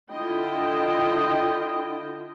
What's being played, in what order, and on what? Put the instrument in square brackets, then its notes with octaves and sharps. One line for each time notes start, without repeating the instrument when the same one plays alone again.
[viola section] D3 E4 F4 D#5 G5